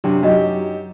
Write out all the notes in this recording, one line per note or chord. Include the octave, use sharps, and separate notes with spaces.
F#2 C3 D4
F#2 D#4 F#4 G4 D#5